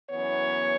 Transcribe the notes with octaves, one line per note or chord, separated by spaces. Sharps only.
F#2 E3 B3 C#5